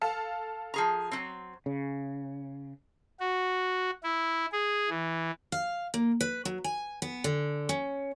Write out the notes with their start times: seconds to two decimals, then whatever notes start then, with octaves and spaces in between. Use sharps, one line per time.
0.01 A4 F5 A5
0.74 F3 G#4 A#5
1.12 F#3 C4
1.66 C#3
3.20 F#4
4.03 E4
4.52 G#4
4.90 E3
5.52 F5
5.94 A#3
6.21 B4
6.45 F#3
6.64 G#5
7.02 B3
7.24 D3
7.69 C#4